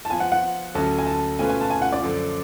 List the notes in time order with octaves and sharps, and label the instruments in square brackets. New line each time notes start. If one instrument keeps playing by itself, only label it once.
[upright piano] A5
[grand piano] F3 B3 F4 [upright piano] G#5
[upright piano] F#5
F#5
[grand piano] D2 D3 F#3 C#4 [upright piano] A5
[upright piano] G#5
A5
[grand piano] B2 A3 C#4 F4 B4 [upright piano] G#5
[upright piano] G#5
A5
G#5
F#5
D5
[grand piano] F#2 D3 F3